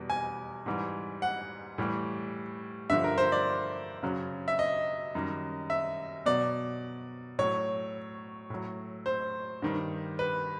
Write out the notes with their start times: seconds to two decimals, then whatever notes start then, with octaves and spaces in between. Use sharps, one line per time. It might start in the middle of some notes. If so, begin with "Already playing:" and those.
Already playing: E2 B2 G3
0.10 G#5
0.66 G#2 E3 G3
1.22 F#5
1.78 A2 E3 G3
2.90 G2 D3 F3 E5
3.04 A#4
3.18 C5
3.32 D5
4.03 F#2 C#3 F#3
4.48 E5
4.59 D#5
5.15 F#2 D#3 G3
5.70 E5
6.26 B2 F#3 D5
7.39 A2 F#3 C#5
8.50 A2 F#3
9.06 C5
9.62 G2 D#3 G3
10.19 B4